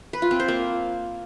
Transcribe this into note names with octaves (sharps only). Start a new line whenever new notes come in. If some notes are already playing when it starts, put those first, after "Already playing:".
B4
F4
C4
C5
A#3